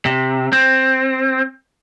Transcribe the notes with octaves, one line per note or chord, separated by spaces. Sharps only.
C3
C4